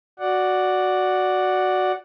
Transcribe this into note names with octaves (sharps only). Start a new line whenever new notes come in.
F#4 D5 F#5